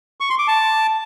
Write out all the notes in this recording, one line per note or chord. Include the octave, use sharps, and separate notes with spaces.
C#6
C6
D6
A5